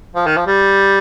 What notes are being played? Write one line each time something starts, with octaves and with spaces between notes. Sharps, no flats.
F3
D#3
F3
G3